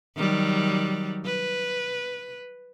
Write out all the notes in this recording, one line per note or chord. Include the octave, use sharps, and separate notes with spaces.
D#3 F#3 G3
B4